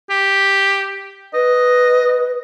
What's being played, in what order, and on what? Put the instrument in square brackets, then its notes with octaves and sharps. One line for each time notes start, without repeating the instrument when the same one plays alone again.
[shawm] G4
[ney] B4 [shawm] D#5